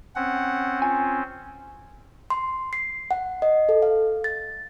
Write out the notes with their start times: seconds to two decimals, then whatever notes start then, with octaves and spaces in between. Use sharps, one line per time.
0.16 C4 C#4 F#5
0.82 F4 G#5
2.30 C6
2.73 C7
3.11 F#5
3.42 D#5
3.69 A4
3.82 F5
4.24 A6